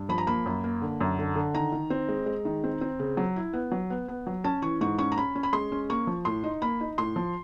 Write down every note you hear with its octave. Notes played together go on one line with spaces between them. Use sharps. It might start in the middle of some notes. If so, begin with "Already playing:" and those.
Already playing: G2
F3 B5
A#5
A#3 B5
F#2
A#3
D3
F#2
D3
D3
D#3 A#5
D#3
C4
G#3
G#3
D#3
C4
C4
C#3
F#3
E4
B3
F#3
B3
B3
F#3
C#4 A5
E3 C#6
G#2 C#6
C#4 C#6
A#5
C#4 B5
C#4
B5
G#3 C6
C#4
A#3 C#6
F3
A2 C6
D#4
A#3 B5
D#4
A2 C6
F3